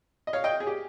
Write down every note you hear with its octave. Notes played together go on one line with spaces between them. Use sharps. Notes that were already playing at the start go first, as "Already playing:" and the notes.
D#5
C#5 F5
D#5 G5
G#4
G4